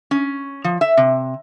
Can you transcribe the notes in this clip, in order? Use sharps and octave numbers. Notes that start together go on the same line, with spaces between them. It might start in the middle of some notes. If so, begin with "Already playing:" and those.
C#4
F3
E5
C3